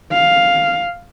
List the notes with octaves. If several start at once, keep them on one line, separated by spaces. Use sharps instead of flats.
F5